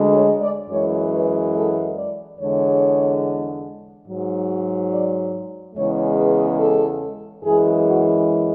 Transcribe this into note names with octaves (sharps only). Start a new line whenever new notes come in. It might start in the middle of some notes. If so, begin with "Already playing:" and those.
Already playing: D2 D3 G#3
C#5
D5
F#2 E3 G#3 C#5
B4
A4
D5
E2 D3 G#3 C#5
G#2 F#3
D5
E2 C#3 G#3 C#5
B4
A4
F#2 E3 G#3 G#4
F#4